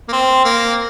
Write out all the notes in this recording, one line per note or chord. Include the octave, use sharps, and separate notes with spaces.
A#3
C4
A#3